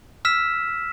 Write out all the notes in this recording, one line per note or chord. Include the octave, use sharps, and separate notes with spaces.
E6 F6 B6 E7